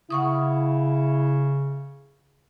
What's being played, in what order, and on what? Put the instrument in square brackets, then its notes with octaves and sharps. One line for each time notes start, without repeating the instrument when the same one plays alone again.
[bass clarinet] C#3 [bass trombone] E4 [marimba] F#5 C#6 D#6